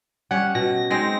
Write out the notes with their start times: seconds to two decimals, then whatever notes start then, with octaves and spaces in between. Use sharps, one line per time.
0.31 G3 C#4 F#5
0.55 B2 A#6
0.90 G#3 C4 D#4 A#6